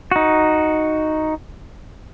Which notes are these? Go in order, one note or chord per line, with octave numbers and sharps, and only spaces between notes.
D#4 F#4